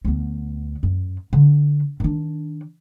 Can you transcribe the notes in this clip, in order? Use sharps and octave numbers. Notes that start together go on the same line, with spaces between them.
D2 B3
F#2
D3
D#3 D4